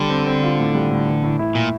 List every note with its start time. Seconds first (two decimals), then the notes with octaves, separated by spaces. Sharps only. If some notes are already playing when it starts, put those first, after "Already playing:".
Already playing: D3 G3
0.10 C4
0.26 C4
0.43 F4
0.59 A2
0.74 G3
0.91 A2
1.07 E3
1.23 A2
1.39 E4
1.55 A#2